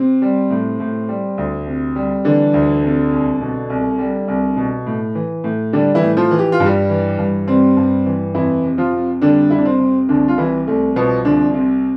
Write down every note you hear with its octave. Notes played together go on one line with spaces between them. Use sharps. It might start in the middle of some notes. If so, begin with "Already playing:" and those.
Already playing: C3 C4
G3
A2
A2
G3
D2
C3
G3
D3 E3 D4
D2
C3
C2
B2
C2
G3
C2
B2
A2
E3
A2
D3 G3 D4
E3 E4
A2
F3 F4
E3
G4
F4
G2
G3 G4
E3
G2
C3 G3 C4
G2
E3
F2 E3 E4
C3
F3 F4
F2
D3 G3 D4
F2 E4
D4
C3 C4
C3
C2 D3 D4
F4
C3 E3 E4
C2 A3
B2 F3 B3
C2 D3 D4
C3